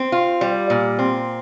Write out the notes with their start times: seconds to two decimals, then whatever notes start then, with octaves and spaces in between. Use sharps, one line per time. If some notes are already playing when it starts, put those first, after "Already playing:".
Already playing: C4
0.12 F4
0.41 G3
0.70 A#2
0.99 C4